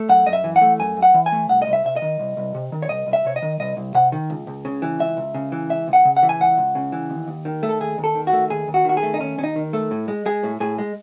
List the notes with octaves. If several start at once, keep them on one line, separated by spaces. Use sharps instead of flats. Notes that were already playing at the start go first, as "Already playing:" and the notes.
Already playing: A3
F#2 F#5
F#2 D#5
E5
E3
F#5
A3
F#2 G#5
F#2
F#5
E3
G#5
A3
C2 F#5
D#5
C2
E5
C3 E5
D#5
D#3
C2
C2
C3
D#3
C#5
C2 D#5
C2
E5
C3 C#5
D#5
D#3
C2 D#5
C2
C3 F#5
D#3
C#2
C#2
C#3
E3
C#2 E5
C#2
C#3
E3
C#2 E5
C#2
F#5
C#3
F#5
E3
G#5
C#2 F#5
C#2
C#3
E3
D#2
D#2
D#3
A3
A4
D#2 G#4
D#2
A4
D#3
F#4
A3
D#2 G#4
D#2
F#4
D#3 F#4
G#4
A3
D#4
D#2 C#4
D#2 C#4
D#4
D#3
A3
A2
G#3
G#3 G#4
A2
A2 G#4
G#3